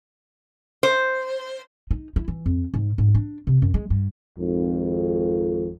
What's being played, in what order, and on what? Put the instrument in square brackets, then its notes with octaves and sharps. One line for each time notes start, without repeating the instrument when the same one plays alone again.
[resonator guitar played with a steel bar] C5
[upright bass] D#4
E4
E3
F2
G#2
G#2
D4
C3
F#2
G#3
G2
[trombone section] G#1 F2